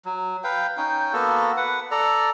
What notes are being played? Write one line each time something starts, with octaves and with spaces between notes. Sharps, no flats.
F#3
B4 F5 G5
C#4 D#4 G5
A#3 B3 F#4 A4
B4 F#5
A4 D5 A#5